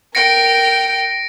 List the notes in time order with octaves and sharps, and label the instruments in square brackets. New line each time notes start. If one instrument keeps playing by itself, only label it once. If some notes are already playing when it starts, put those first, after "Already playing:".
[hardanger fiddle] A#4 G5 [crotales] A#6 C#7 D7